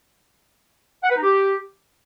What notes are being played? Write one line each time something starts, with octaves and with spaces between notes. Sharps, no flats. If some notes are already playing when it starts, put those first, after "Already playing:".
F#5
B4
D#4
G4